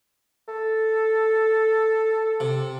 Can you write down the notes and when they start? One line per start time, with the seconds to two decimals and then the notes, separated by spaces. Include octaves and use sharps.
0.48 A4
2.40 C3